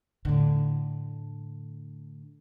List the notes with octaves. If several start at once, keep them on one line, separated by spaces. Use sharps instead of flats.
A2 D3